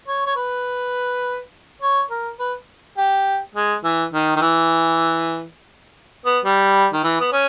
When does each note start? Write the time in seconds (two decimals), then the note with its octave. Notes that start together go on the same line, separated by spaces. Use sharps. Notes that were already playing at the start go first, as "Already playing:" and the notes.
0.08 C#5
0.26 C#5
0.36 B4
1.81 C#5
2.10 A#4
2.39 B4
2.97 G4
3.55 G#3
3.84 E3
4.14 D#3
4.36 D#3
4.42 E3
6.26 B3
6.45 G3
6.93 D#3
7.03 E3
7.20 B3
7.32 C#4